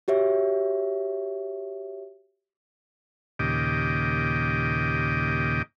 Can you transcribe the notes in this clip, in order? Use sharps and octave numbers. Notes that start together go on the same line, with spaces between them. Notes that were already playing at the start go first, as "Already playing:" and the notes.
F#4 G4 C#5 E5
D#2 A#2 C#3 G4 D#5 D6